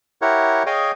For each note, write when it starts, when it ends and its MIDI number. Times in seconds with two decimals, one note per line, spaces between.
0.22 0.63 64
0.22 0.63 67
0.22 0.63 70
0.22 0.63 73
0.22 0.63 78
0.66 0.91 68
0.66 0.91 73
0.66 0.91 75
0.66 0.91 77
0.66 0.91 79
0.66 0.91 80